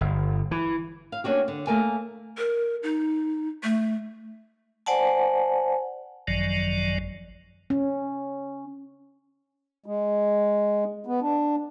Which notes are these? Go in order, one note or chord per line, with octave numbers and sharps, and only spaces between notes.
G1
E3
F5
A#3 C#4 D4 F#4 G4
D3
A3 A#3 A#4 G#5
A#4
D#4
A3
C5 D5 F#5 G#5 A5
G#1 F#2 D#3 F3 F#3 D5
C#4
G#3
B3
D4